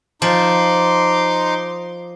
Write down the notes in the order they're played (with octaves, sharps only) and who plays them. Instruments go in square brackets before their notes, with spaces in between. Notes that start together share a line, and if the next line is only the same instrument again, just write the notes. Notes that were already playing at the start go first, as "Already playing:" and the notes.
[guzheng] F3 [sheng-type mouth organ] D#4 C6 D6